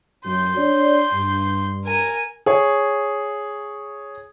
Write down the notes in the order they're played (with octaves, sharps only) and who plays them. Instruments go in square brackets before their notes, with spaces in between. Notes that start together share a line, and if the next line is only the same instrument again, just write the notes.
[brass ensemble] F#2 [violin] C6 G6
[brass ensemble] D4 C#5 D5
G2
[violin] A#4 G#5
[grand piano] G#4 C#5